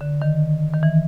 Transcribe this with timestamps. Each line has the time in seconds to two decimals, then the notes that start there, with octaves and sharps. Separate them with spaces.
0.01 D3
0.22 D#3
0.74 D#3
0.83 E3